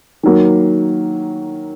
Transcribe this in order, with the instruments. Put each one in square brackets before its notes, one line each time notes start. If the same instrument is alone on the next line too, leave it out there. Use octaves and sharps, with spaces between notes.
[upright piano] D#3 F#3 A#3